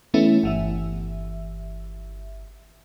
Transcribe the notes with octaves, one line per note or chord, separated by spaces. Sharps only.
E3 A3 B3 C#4 E4
G1 E3 E5